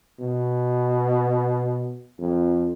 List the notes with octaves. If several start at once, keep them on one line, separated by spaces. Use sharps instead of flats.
B2
F2